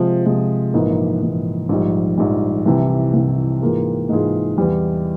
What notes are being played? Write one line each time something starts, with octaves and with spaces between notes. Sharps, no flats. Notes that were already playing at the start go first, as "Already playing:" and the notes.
Already playing: C3 F3 G#3
C3 F3 G#3
A#1 G#2 E3 A#3
A#1 G#2 E3 A#3
A#1 G#2 G3
A#1 G#2 G3
C2 C3 E3
C2 C3 E3
G#2 E3 A#3 F4 G#4
G#2 E3 A#3 F4 G#4
E2 E3 G3